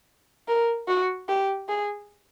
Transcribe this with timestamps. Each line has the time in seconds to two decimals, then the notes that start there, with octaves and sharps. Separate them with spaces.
0.48 A#4
0.88 F#4
1.29 G4
1.69 G#4